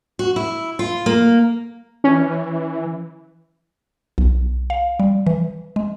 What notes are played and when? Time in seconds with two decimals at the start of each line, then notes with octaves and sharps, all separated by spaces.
0.19 F#4
0.36 E4
0.79 F4
1.06 A#3
2.04 E3 C#4
4.18 B1
4.70 F5
5.00 G3
5.26 E3
5.76 G#3